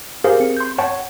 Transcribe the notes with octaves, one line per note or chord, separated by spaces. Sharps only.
G4 G#4 A#4 C5 F5
C4 C#7
C6 G6
C#5 F#5 G5 A5 C#6